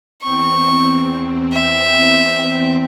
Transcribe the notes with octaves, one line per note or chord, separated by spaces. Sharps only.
E2 C4 C#6
E5